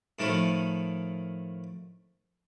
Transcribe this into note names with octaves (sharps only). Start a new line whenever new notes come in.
A2 D#3 F3 A3